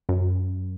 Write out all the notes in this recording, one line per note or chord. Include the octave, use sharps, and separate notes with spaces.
F#2